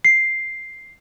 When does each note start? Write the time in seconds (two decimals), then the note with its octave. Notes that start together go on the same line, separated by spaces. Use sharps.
0.05 C7